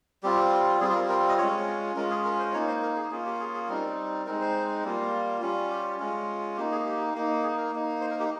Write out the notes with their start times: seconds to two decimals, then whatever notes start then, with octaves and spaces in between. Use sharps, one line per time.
0.23 G3 C4 F4 G4
0.81 G3 C4 F4 G#4
0.95 A#4
1.09 A#4
1.29 D#5
1.38 G#3 C#4 F4 C#5
1.96 G#3 C#4 F4 A#4
2.10 G#4
2.25 A#4
2.39 C5
2.53 A#3 D#4 C#5
2.68 C5
2.83 A#4
2.96 G#4
3.11 A#3 C#4 F4 G#4
3.26 G4
3.40 G#4
3.55 G#4
3.68 G3 C4 D#4 A#4
4.26 G#3 C4 D#4 A#4
4.41 C5
4.84 G3 A#3 F4
5.42 G3 C#4 F4
5.70 G4
6.00 G#3 C#4 F4
6.57 A#3 D#4 G4
6.72 G#4
6.86 G4
7.14 A#3 D#4
7.43 G#4
7.58 A#4
7.72 A#3 D#4
8.01 C5
8.11 A#4
8.20 G4